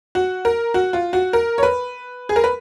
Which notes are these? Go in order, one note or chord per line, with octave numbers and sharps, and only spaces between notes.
F#4
A#4
F#4
F4
F#4
A#4
C#5
B4
G#4
A#4
B4